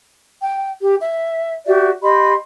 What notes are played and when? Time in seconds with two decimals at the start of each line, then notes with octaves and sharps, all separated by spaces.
0.42 G5
0.81 G4
1.00 E5
1.66 F#4 G4 D5 E5
2.02 G4 D#5 B5 C6